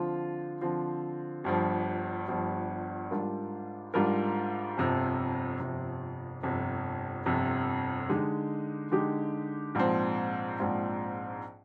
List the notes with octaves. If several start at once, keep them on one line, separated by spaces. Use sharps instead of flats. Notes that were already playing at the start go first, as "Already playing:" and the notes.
Already playing: D3 F3 C4 F4
D3 F3 C4 F4
G1 G2 F3
G1 G2 F3
G#2 G3 D4 F4 A#4
G#2 G3 D4 F4 A#4
G1 F2 C3 F3
G1 F2 C3 F3
G1 F2 C3
G1 F2 C3
D3 G#3 D#4 G4
D3 G#3 D#4 G4
A#1 G#2 F3 C4
A#1 G#2 F3 C4